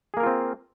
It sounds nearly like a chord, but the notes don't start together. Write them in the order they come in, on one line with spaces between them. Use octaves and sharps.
G#4 A#3 A#4 F4 C4